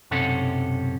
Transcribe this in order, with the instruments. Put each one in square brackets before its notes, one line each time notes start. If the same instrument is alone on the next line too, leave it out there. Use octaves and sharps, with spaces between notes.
[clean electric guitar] B1 F#2 C3 C#4 A4 F#5